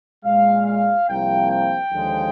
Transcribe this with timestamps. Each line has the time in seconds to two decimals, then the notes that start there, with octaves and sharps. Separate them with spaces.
0.24 A#2 G#3 F5
0.66 F5
1.08 C2 C3 F3 A#3 G5
1.49 G5
1.91 D#2 D3 F3 G#3